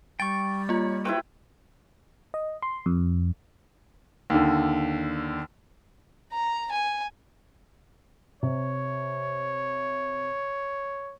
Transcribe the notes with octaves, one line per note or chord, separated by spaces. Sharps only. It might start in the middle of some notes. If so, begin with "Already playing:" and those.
G3 G5 C#6 A6
A#3 F4 C#5
E4 F#4 G4 B4 C5 G5
D#5
C6
F2
D#2 D3
A#5
G#5
C3 C#5